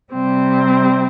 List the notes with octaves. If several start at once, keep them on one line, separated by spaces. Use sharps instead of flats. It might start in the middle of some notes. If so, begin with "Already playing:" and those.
C3 G3 C4